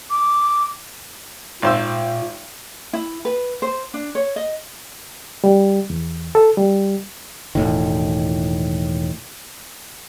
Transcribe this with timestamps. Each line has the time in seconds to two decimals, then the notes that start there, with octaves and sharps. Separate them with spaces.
0.10 D6
1.62 G#1 A#2 C5 E6
2.93 E4
3.25 B4
3.62 C5
3.94 D4
4.15 C#5
4.36 D#5
5.44 G3
5.90 E2
6.35 A4
6.57 G3
7.55 E1 A2 D#3